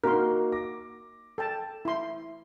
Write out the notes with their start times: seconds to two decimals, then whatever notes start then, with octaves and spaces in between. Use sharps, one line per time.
0.04 A#3 D#4 F#4 A#4 C6
0.52 D6 A#6
1.38 A4 G5 A5
1.85 E4 C6